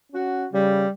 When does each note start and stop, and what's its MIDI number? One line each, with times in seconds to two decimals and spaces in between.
0.12 0.45 61
0.12 0.45 66
0.52 0.87 49
0.52 0.87 55